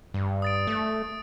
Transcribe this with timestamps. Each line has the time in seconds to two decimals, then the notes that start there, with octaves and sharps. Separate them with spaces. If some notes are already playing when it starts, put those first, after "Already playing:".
0.14 G2
0.42 D#6 A6 D7
0.67 A3